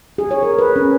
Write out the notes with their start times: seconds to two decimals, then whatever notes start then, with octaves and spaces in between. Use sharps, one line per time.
0.18 G#4
0.31 C#5
0.43 A#4
0.59 B4
0.76 C#4